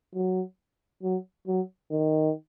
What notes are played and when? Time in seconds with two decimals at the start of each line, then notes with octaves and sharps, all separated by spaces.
0.15 F#3
1.03 F#3
1.47 F#3
1.91 D#3